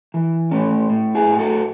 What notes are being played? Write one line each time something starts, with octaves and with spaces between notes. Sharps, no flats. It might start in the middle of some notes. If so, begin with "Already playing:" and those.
E3
A2 A3 C#4
A2
E4 G#4
A2
F#4 A4